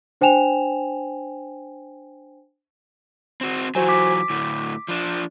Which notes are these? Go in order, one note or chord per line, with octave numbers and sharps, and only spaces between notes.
D4 C5 G5 G#5 E7 F7
C4 F#4
E3 F#3 F#4 C5 G#5
D6 B6
D2 A2
F3 D4